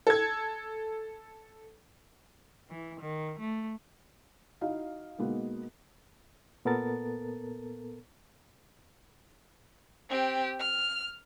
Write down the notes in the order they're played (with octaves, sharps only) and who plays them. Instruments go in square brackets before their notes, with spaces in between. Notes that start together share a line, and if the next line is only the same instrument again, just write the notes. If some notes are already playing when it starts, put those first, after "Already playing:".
[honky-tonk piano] A4 G#6
[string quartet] E3
D#3
A3
[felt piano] D#4 E4 F#4 F5
B2 G#3 A#3 B3 D#4
[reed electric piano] A#2 B3 A4 A#4 A6
[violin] C4 G4
F6